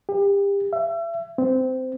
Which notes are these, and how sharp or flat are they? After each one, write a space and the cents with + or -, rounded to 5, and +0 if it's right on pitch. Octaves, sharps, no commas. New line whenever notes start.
G4 +30
E5 +35
C4 -20